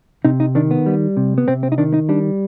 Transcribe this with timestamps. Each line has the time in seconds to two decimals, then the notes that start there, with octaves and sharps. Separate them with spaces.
0.25 C3 D#4
0.40 D#4
0.55 D#3 D4
0.71 B3
0.86 G3
1.17 C3
1.38 B3
1.48 C3 C4
1.63 C4
1.72 D#4
1.78 D#3 D4
1.94 D#4
2.09 G3 D4